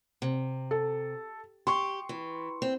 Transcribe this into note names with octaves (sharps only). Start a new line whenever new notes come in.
C3
A4
G4 C6 C#6
E3
C4